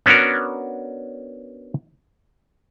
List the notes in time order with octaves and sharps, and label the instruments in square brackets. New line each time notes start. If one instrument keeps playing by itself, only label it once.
[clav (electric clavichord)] B3 C#4 D4 F#4 A#4